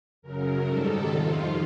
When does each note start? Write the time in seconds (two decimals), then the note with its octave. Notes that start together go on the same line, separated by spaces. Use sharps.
0.22 F#2 C#3 F#3 A#4
0.65 G#2 D#3 G3 A4
1.07 F2 C3 D#3 F4